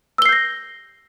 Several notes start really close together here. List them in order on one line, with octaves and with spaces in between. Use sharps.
E6 G7 C7 G6 A#6